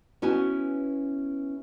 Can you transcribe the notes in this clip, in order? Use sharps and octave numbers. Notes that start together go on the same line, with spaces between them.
B3 C#4 E4 F#4 G#5